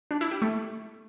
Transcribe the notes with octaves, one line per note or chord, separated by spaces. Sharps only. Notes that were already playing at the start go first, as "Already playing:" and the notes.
D4
E4
G4
A3